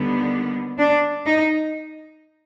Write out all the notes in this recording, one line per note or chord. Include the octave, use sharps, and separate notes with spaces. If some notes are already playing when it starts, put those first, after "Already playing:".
Already playing: D#2 D3 G3 B3
D4
D#4